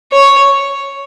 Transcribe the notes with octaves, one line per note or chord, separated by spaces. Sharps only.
C#5